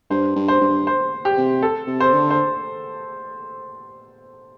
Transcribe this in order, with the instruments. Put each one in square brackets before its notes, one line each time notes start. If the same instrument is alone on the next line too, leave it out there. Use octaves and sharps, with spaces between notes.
[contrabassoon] G2 [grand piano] C5
[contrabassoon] G2
[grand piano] C5
[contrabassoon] G2
[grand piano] C5
G4
[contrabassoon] C3
[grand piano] A4
[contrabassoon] C3
[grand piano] C5
[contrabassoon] D3
[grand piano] C5